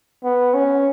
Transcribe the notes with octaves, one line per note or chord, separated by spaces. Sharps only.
B3
C#4